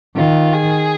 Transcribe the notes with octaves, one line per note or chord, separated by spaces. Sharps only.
D#3 F4
G#4